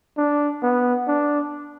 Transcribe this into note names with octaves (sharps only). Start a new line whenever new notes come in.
D4
B3
D4